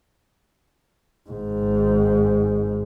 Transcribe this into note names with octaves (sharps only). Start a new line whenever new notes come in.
G#1 G#2